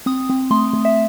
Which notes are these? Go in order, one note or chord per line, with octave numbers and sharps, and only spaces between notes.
C4 D#6
C4
A3 C6
A3
E5